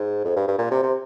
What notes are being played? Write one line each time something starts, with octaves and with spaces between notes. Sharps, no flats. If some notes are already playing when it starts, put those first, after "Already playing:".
Already playing: G#2
F2
G2
G2
A#2
C3
C3